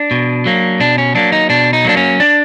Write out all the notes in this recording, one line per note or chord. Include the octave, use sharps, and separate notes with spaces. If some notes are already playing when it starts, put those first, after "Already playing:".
Already playing: D4
B2
F#3 A#3
B2 D4
C#4
F#3 A#3 D4
D#4
B2 D4
D#4
F#3 A#3 D4
C#4
D4